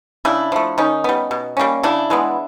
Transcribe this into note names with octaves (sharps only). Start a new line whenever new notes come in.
C#3 D4 E4
F3 A3
D#3 C#4 D#4
G3 B3
B2
G3 A#3 C#4
C#3 D4 E4
E3 G#3 B3